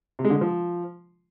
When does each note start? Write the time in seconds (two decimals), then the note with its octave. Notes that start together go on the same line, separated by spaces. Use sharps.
0.19 C3
0.24 G#3
0.30 D3
0.36 G#3
0.41 F3